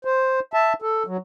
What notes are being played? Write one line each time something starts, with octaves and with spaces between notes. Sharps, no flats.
C5
E5 A5
A4
F#3